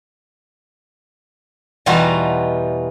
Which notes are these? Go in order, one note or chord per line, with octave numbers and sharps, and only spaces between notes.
E2 B2 G3 D#4 F4 F#4